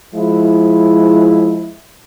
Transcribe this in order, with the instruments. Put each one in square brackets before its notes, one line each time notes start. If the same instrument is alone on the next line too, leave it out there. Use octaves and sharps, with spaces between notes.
[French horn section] F3 G#3 E4